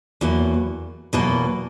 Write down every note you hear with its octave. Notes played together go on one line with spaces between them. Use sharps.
E2 B2 F#3 A#3
E2 B2 F#3 A#3